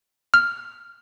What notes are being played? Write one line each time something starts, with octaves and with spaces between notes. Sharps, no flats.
F6